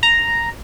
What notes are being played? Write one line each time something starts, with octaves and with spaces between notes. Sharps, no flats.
A#5